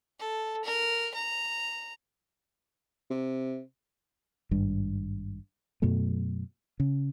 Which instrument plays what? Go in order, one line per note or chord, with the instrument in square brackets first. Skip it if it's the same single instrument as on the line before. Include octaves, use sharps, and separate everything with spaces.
[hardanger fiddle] A4
A#4
A#5
[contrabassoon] C3
[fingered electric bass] G#1 G2
F#2 B2 F#3 A3
C#3